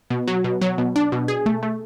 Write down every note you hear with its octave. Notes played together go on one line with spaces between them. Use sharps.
B2
F#3
B2
F#3
B2
D4
B2
G#4
A3
A3